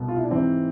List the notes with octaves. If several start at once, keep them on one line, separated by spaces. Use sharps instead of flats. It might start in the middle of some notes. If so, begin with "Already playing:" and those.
Already playing: C2 B2
F4
E4
D4
G#2 E3 C4